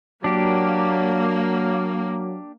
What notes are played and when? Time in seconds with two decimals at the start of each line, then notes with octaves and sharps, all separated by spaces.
0.24 F#3 A#3 D4 G4